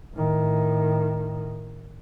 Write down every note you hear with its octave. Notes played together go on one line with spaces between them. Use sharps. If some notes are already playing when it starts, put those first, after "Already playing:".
A2 D#3